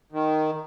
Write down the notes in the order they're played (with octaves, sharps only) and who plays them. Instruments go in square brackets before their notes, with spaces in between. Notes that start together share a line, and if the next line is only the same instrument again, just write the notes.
[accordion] D#3